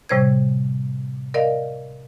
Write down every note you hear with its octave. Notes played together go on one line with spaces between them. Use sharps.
A2 C3 G3 C5 C#5 G#6
A#4 D5 D#5 F5